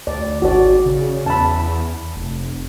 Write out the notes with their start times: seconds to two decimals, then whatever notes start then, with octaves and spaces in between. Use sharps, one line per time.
0.07 D2 D5
0.42 G#1 F#4 D5
0.85 C#3
1.26 E2 A5 B5
2.15 F1